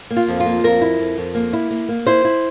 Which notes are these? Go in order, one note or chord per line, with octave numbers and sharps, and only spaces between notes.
A#3
F4
F2
F4
A#3
F2 A#4
E4
F2
F2
A#3
E4
A#3
A#3
E4 C5
E4